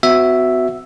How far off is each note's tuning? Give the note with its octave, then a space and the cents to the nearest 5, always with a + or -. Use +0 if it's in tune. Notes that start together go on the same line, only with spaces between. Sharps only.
B3 +45 F#4 +0 E5 +0